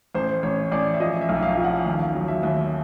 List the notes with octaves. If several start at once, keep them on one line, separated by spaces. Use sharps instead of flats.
A1 C5
A1 C#5
A1 D5
E5
F3 D#5
E5
B1
F5
F3
F#5
D#2
F#3
E5
D#2